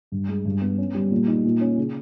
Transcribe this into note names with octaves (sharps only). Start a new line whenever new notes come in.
G2
G#3
G2
B3
C#4
G3
A#2
D#4
A#2
C#4
C#3